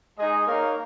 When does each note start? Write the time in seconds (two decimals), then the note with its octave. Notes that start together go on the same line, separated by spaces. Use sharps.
0.19 G#3 D#4 G#4 D#5
0.47 A#3 D#4 A#4 C#5 F5